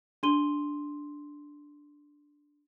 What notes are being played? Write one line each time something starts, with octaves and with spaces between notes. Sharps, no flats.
D4 C6 D#7 G7